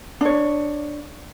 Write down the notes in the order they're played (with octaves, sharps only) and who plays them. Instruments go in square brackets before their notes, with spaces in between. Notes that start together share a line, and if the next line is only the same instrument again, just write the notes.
[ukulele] D4 C#5